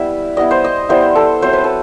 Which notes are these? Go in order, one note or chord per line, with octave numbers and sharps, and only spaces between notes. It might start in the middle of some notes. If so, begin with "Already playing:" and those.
Already playing: G3 B3 E4 E5
G3 B3 E4 D#5
C5
D#5
G3 B3 E4 C5
A4
F#3 C4 E4 C5
B4
A4